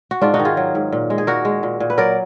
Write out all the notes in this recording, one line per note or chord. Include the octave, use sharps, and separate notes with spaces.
F#4
G#2 D4 F4
D#4 F#4
D#3
F4 G#4
F#3
G#2
A#2
G#3
G#4
A#2 F#4 A#4
G#3
A#2
A#2
B4
F#3 A#4 D5